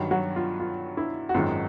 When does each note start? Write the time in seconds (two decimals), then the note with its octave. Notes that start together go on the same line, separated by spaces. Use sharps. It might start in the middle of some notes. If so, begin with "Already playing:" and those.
Already playing: G2 D#3 F#3
0.11 F#3 F#4
0.36 F4
0.60 F4
0.97 E4
1.29 F#4
1.34 G#1 F#2 D#3 G#3 F4